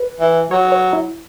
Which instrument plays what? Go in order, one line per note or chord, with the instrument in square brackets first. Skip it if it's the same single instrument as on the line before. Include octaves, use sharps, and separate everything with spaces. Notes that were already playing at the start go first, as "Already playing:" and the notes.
Already playing: [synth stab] B4
[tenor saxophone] E3
[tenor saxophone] F#3 [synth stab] C#5
[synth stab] C#5
E4